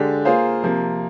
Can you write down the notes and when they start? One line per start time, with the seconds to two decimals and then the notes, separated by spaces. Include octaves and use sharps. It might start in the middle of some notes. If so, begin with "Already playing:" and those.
Already playing: D3 G#3 D4 G4
0.25 A#3 F4 G#4 C5 F5
0.63 C3 F3 A#3